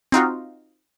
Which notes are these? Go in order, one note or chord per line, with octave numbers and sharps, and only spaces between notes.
C4 D#4 F4 F#4